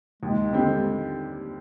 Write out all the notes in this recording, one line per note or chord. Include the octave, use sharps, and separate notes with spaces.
D#2 G#3
D3 G3 C4